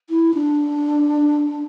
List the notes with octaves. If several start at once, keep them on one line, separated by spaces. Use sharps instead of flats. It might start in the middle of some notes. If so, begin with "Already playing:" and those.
E4
D4